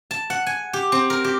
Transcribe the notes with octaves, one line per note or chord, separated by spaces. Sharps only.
A5
F#5
G#5
G4
C4
A#4
G4